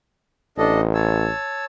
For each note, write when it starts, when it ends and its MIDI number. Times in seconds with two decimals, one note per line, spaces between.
0.58 1.29 33
0.58 0.81 62
0.58 0.81 69
0.58 0.81 75
0.94 1.65 73
0.94 1.65 81
0.94 1.65 88